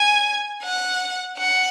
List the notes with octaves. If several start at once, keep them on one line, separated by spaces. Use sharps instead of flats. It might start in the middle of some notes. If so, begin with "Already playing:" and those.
Already playing: G#5
F#5
F#5